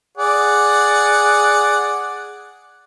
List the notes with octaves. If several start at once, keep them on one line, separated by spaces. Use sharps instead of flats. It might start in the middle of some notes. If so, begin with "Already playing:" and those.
G#4 D5 F#5